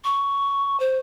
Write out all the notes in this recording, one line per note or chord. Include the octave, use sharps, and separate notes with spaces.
C#6
C5